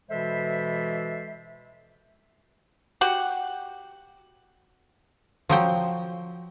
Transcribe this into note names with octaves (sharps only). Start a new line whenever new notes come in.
B2 E3 G#3 A4 C5 E5
F#4 G4 F#5
F3 F#3 G5